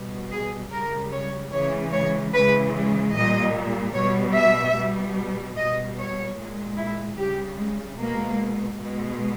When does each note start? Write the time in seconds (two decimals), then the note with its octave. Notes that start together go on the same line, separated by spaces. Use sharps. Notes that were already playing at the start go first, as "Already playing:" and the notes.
Already playing: B2 G3
0.31 G#4
0.72 C#3 G3 A#4
1.12 C#5
1.52 C#3 E3 G#3 C#5
1.92 C#5
2.33 C#3 E3 G#3 B4
3.13 A#2 G3 D#5
3.94 B2 G3 C#5
4.36 E5
4.75 B2 G3
5.56 B2 G3 D#5
5.97 C#5
6.37 A#2 G#3
6.77 E4
7.18 C#3 G3 G4
7.58 G#3
7.98 B2 G#3 A#3
8.79 B2 G#3